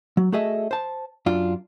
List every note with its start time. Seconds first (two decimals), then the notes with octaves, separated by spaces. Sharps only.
0.17 F#3
0.32 A3 F#4 G#4 A4 D#5 E5
0.71 C5 A5
1.26 F#2 D4 F4